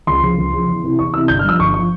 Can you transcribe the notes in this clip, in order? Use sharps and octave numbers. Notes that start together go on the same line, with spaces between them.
C#2 C6
C#3 F3
C#2
C#3 F3
E2
C3 E3
E2 C#6
C3 E3 E6
G1 G6
F6
G2 F3 E6
G1 C#6
F3 C#6